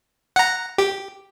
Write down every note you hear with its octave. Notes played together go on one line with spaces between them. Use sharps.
F#5 A#5
G4